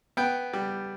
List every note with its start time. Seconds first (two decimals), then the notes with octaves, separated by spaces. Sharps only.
0.17 B3 G5
0.53 G3